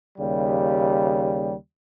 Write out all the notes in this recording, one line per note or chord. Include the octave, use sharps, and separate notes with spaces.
D#2 C#3 G3